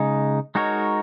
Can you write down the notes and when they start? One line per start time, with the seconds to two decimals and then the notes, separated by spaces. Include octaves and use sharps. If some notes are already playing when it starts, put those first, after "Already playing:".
Already playing: C#3 G#3 D#4
0.55 G#3 D#4 F#4 A#4 C#5